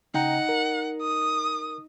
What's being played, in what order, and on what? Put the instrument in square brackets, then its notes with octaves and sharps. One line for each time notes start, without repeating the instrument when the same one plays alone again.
[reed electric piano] C#3 G5 A#5 [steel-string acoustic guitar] D#4 D#5 [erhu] F#5
[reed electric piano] A#4
[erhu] D#6